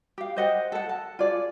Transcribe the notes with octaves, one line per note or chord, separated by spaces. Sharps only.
G4 F5
C5 D#5 F#5 G5
A4 F#5
A5
F4 G#4 D5